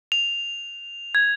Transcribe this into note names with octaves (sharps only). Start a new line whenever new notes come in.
F7
G#6